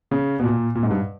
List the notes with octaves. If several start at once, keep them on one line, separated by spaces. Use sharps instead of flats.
C#3
B2
A#2
A#2
G#2
G2